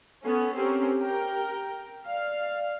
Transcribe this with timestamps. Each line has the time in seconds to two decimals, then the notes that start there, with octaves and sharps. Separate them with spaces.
0.24 B3 C#4 A4
0.56 C4 C#4 G4 A#4
1.00 A#4 G5
2.06 D5 F5